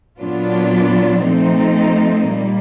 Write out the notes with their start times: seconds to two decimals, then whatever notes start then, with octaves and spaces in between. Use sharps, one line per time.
0.18 A#2 F#3 B3 D4 F4
1.24 F3 A3 C4 D#4
2.30 A#2 G3 A#3